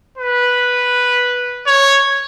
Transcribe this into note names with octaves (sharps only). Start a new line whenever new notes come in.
B4
C#5